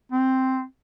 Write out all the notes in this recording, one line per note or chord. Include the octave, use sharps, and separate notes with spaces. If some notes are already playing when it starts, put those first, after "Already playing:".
C4